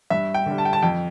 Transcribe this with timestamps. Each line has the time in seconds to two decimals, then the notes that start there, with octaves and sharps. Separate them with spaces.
0.10 G2 E5
0.34 G5
0.46 D3 G3
0.58 A5
0.65 G5
0.73 A5
0.82 F2 G5